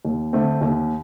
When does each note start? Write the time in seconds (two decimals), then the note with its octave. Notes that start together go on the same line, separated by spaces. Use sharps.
0.04 D#2
0.33 D3 A3 C4
0.61 D#2